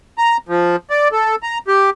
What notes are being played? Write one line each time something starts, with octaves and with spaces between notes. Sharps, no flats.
A#5
F3
D5
A4
A#5
G4